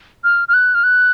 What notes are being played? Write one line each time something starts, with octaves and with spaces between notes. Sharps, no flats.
F6
F6
F#6
F6
F#6